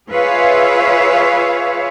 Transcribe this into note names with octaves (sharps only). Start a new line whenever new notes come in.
F4 G#4 B4 C#5 E5 F5